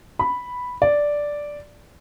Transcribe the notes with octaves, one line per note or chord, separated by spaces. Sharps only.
B5
D5